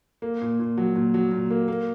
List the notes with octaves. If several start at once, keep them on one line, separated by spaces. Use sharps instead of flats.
A#3
A#2
A#2
F#3
A#2
F#3
A#2
A#3
A#3